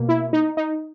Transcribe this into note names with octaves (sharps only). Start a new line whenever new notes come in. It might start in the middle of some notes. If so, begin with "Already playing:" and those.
Already playing: B2 A#3
E4
D#4
D#4